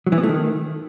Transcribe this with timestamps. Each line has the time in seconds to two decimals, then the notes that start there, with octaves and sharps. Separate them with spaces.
0.07 F#3
0.12 E3
0.18 B3
0.23 A3
0.29 D#3